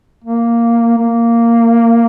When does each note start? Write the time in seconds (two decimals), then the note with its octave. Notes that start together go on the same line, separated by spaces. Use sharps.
0.24 A#3
0.98 A#3